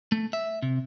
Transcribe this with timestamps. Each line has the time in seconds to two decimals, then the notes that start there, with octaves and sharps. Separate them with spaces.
0.12 A3
0.33 E5
0.62 C3